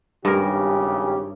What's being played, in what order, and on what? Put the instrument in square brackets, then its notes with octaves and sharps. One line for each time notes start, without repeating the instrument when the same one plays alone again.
[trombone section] G#1 C#3 G4 [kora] G2 A#4